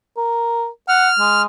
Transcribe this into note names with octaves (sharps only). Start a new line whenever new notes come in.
A#4
F#5 F6
G#3